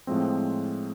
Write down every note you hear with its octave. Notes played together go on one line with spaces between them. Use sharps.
A2 F3 G#3 C4